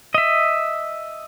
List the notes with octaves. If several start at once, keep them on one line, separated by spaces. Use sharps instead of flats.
D#5 E5